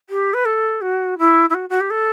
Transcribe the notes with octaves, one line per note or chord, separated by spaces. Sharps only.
G4
B4
A4
F#4
E4
E4
F#4
F#4
G4
A4